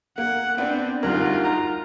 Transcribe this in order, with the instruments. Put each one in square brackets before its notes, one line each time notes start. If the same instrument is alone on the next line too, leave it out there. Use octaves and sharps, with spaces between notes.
[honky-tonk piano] A#3 [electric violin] F#5
[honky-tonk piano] B3 D4 [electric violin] C4
[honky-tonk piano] D2 G2 F#6 [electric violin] D#4 F4 [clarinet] A#4
[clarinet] A#5 [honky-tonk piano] F6